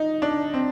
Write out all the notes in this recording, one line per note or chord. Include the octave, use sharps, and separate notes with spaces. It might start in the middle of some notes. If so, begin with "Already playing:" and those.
Already playing: D#4
D4
C4